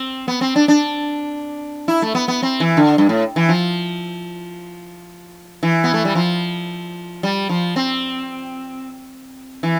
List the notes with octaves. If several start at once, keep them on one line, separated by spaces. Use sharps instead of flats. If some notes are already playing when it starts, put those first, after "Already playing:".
Already playing: C4
B3
C4
D4
D4
E4
A3
B3
B3
C4
E3
D3
G2
A2
E3
F3
E3
B3
A3
G3
F3
G3
F3
C4
E3